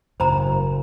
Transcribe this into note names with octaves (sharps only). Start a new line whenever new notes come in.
F#1 A2 C5 A#5